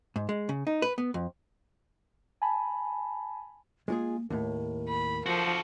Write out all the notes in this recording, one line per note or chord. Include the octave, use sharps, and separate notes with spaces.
G#2
G#3
C#3
D#4
B4
B3
F2
G#5 A5 B5
G#3 A#3 F4 G#4
D#2 A2 A#4
B5
F3 F#4 A4